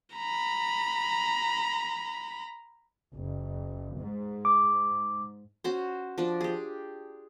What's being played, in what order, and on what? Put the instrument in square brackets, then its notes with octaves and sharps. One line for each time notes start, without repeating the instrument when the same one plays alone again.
[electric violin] A#5 B5
[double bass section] F#1
G#2
[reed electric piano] D6
[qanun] C#4 F#4 C5
F3 D4 D5
G4 G#4